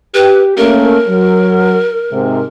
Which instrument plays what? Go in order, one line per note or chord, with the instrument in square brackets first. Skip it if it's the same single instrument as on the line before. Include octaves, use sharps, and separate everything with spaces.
[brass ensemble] G4 [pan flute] B4
[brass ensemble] A3 A#3 C#4 [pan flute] A#4
[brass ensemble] F#3
G#2 C3